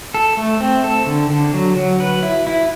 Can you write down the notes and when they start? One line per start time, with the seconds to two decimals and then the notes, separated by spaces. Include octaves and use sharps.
0.14 A4
0.37 A3
0.60 C4
0.84 A4
1.06 D3
1.30 D3
1.54 F#3
1.77 F#3
2.00 B4
2.23 E4
2.47 E4